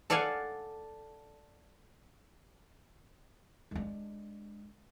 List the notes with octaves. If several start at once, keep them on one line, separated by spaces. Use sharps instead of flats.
A4 D5 F5 F#5 G#5
G#3 D4